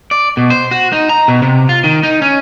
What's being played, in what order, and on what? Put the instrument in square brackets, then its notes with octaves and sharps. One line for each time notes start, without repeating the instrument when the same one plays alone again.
[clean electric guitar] D5
B2
C5
F#4
D#4
A#5
B2
C3
F4
D#3
D#4
C#4